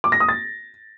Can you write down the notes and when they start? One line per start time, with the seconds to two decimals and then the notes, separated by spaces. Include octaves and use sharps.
0.04 D6
0.12 A#6
0.20 D#6
0.29 A6